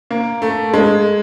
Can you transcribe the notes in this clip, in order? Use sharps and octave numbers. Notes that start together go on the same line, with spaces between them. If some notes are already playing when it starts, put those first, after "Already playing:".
A#3
A3
G#3